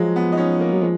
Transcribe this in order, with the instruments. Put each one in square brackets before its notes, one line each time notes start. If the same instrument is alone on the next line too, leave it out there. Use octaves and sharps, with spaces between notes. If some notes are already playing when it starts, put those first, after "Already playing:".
Already playing: [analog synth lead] F3 [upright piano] F#3 G#3
[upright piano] B3
D#4
C#4
A#3
[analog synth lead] F#3
[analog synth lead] F3 [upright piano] G#3